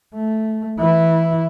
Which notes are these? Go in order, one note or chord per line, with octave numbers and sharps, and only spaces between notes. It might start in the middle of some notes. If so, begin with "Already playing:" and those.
A3
E3 E4